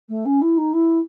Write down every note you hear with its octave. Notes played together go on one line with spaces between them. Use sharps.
A3
C#4
E4
D#4
E4